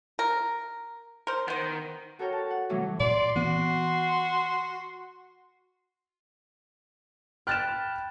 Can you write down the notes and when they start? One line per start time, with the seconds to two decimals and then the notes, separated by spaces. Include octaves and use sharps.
0.19 A#4
1.27 A#4 C5
1.48 D#3 B3 C5
2.19 F#4 A4 A#4 C#5 G5 F6
2.33 A5
2.50 F#5
2.69 A2 C3 E3 F#3 G3
3.00 A#2 D5 C6
3.36 E3 B3 F#4
7.47 G5 B5 F6 F#6 A6 E7